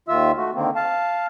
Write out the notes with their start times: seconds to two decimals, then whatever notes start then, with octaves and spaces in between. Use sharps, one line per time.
0.08 D#2 D#3 F4 E5 E6
0.37 A3 F#4
0.55 D3 D#3 A#3 C4
0.75 F5 A5